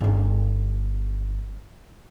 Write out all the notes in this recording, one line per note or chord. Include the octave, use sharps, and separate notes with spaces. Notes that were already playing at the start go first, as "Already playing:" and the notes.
G1 C#4